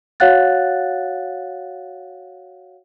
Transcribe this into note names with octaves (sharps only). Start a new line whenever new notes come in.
F#4 C#5 F5 F#5 F#6 A6